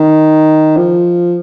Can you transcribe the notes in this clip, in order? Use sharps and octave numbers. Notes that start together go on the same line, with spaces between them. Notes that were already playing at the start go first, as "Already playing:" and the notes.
Already playing: D#3
F3